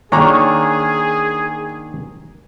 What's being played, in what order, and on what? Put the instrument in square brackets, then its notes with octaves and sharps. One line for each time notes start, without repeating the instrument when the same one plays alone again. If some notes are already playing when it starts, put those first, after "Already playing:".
[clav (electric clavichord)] D#3 A#3 D4 [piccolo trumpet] G#4 [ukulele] C#5 [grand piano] G#5 A#5